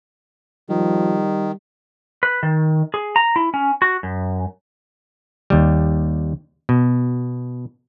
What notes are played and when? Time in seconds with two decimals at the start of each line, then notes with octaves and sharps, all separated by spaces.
0.69 D#3 F3 G3
2.23 B4
2.43 D#3
2.94 G#4
3.16 A#5
3.36 E4
3.54 C#4
3.82 F#4
4.03 F#2
5.50 D#2 G3
6.69 B2